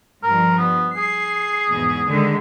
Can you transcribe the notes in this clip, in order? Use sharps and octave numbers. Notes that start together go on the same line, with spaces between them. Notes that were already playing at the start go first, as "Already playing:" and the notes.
G2 F3 A#4
B3
G#4 C7
E2 G#2 B2
D3 D#3 G#3